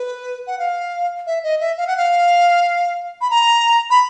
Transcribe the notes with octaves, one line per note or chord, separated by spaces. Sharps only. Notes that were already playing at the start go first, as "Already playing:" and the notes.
Already playing: B4
F#5
F5
E5
D#5
E5
F5
F#5
F5
B5
A#5
B5